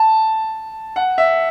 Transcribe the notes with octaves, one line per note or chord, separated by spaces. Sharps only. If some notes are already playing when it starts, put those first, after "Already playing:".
Already playing: A5
F#5
E5